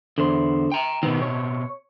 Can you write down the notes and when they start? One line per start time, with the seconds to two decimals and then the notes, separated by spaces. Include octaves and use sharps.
0.18 E2 D3 C5
0.72 G5 A#5
1.03 B2 D#3 B3 C4
1.22 C#5